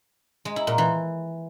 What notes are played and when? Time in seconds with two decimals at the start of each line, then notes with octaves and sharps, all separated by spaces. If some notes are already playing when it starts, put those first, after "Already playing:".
0.45 G#3
0.56 E4
0.67 A#2
0.78 E3